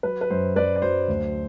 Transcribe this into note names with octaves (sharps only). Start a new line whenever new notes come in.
F#3 B4
B4
F#2 C5
F#2 B4 D5
D5
F#3 C5
D2